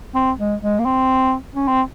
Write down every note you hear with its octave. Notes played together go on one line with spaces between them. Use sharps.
C4
G#3
G#3
A#3
C4
C#4
C4